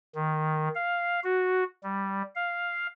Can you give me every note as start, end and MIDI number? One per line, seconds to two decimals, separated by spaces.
0.15 0.68 51
0.75 1.20 77
1.24 1.64 66
1.83 2.22 55
2.35 2.87 77